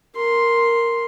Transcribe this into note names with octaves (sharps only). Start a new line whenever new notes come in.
A#4 C6